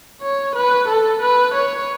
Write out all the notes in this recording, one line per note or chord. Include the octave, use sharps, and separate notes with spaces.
C#5
B4
A4
B4
C#5